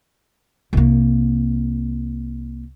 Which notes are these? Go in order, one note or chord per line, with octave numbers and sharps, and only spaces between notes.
C2 A#3